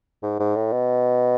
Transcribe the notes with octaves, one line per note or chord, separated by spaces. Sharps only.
G#2
G#2
A2
B2